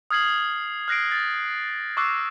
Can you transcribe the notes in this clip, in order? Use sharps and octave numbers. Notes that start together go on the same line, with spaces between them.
D#6 F6 G#6 C7 F#7
F6 F#6 A#6 C7 D7
A6
C#6 D6 E6 F#6 C7